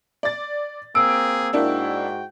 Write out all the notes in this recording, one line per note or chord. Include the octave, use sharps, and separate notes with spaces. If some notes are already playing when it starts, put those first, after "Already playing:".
D5 A6
A#3 C4 G#4 E6 D7
G#2 A#3 D4 E4 F#4 G5